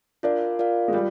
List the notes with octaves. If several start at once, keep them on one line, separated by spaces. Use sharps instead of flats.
D4 F4 A#4 D5 F5
F4 A#4 D5 F5
G#3
G3 F4